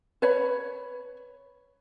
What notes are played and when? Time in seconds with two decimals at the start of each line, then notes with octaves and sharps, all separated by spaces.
0.22 B4 C#5 B5